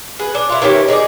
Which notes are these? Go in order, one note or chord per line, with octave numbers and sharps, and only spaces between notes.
G#4 B4
D4
E4 F4
D#3 E3 C#4 G4
D#4 G#4 C#5 D5